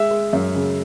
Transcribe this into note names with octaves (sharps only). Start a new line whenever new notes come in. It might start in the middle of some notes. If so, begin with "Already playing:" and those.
Already playing: G#3 E5
G#3
F#2
C#3